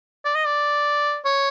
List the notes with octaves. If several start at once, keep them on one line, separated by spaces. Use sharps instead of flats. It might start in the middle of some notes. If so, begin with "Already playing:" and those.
D5
D#5
D5
C#5